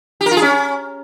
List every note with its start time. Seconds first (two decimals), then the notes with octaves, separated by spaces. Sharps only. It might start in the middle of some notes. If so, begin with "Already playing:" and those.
0.21 G4
0.26 A#4
0.31 F4
0.37 G#4
0.42 C#4